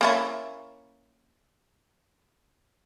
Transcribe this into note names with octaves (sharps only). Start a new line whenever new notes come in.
A#3 C#4 E4